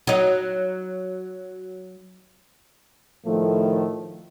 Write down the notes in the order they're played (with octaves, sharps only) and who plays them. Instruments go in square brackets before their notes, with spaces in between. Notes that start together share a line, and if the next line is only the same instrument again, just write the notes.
[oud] F#3 D#4
[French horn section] A2 D#3 F3 A3